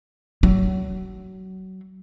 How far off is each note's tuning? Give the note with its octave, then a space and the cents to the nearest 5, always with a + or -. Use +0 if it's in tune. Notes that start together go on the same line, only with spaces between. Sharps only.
F#3 +25